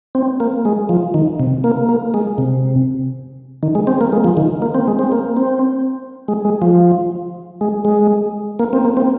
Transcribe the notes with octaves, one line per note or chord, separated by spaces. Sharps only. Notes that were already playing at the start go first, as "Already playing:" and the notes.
C4
A#3
G#3
F3
D#3
C3
A#3
A#3
G#3
C3
D#3
G#3
C4
A#3
G#3
F3
D#3
A#3
C4
G#3
C4
A#3
C4
G#3
G#3
F3
G#3
G#3
A#3
C4
A#3
C4